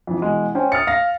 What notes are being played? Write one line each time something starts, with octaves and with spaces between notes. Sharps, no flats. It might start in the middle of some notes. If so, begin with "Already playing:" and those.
F2 E3
B2 E3 G#3
C#4 C5 G5
D#6 F6 A6 C#7
F5 A#6